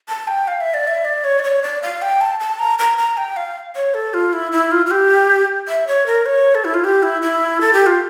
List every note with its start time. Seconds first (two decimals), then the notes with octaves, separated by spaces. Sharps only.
0.09 A5
0.27 G5
0.48 F5
0.61 E5
0.74 D5
0.87 E5
1.05 D5
1.24 C#5
1.39 D5
1.44 C#5
1.63 D5
1.82 F5
2.02 G5
2.21 A5
2.40 A5
2.59 A#5
2.79 A#5
2.98 A#5
3.17 G5
3.37 F5
3.76 C#5
3.94 A4
4.14 F4
4.33 E4
4.52 E4
4.72 F4
4.86 F4
4.91 G4
5.68 E5
5.87 C#5
6.06 A#4
6.26 C#5
6.55 A4
6.65 E4
6.74 F4
6.84 G4
7.03 E4
7.22 E4
7.61 A4
7.73 G4
7.86 F4